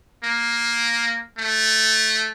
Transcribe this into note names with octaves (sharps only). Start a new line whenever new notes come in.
A#3
A3